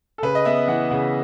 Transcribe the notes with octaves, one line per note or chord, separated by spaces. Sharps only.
A4
C#3 B4
D#5
B3 E5
E3 F#5
C#3 F#5